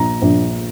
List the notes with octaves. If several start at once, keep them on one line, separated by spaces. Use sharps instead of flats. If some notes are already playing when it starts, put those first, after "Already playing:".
Already playing: A#1 A#5
A#1